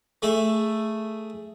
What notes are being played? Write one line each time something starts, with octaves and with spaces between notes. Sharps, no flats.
A3 G#4 E5